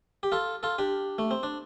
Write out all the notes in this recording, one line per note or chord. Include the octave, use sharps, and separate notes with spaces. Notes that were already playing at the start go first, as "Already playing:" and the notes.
G4
F4 A4
F4 A4
D4 G4
A3
C4
D4